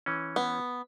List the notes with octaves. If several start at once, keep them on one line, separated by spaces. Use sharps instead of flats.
E3 C#4
B3